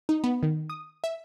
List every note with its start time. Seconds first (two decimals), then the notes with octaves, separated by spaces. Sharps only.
0.09 D#4
0.24 B3
0.43 D#3
0.70 D#6
1.04 E5